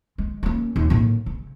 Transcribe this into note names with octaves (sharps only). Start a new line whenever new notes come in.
G#3
A#3 C#4
D#2 E3
A2 A#3
C#3